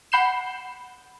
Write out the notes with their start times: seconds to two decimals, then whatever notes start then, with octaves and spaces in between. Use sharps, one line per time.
0.12 F#5 B5 G6 C7 E7